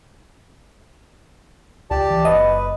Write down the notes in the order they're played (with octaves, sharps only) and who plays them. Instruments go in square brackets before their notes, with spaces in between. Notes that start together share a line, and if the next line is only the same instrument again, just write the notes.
[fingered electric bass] C#2 [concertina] G4 D5 A5
[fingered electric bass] E3
[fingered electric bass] F#1 [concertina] B4 [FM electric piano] D#5